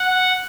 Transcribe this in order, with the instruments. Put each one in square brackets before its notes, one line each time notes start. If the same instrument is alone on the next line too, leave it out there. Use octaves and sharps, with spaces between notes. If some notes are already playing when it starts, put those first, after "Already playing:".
Already playing: [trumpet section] F#5